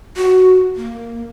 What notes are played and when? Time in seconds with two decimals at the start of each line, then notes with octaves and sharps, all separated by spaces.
0.17 F#4
0.76 A#3